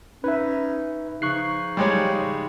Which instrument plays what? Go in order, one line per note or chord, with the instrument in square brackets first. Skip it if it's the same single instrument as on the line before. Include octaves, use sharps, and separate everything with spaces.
[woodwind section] C#4 D#4 [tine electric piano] B4 E5
[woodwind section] C#3 F3 D#4 [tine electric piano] C#6 F#6 C7
[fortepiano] G3 G#3 C#5